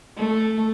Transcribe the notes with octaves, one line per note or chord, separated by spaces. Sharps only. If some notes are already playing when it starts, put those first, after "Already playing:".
A3